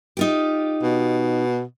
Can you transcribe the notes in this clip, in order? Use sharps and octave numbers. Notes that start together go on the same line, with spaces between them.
D#4 F4 G4
B2